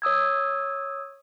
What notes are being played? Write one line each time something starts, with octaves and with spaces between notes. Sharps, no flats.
C#5 D#6 E6 G#6